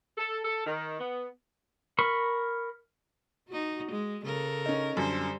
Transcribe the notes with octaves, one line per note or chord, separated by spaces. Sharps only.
A4
A4
D#3
B3
A#4 B5 C#6
D#4 F#4
G#3
C#3 A4 A#4
C#4 D#4
F#2 D3 G3 C5